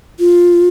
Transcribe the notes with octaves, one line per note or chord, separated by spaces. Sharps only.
F4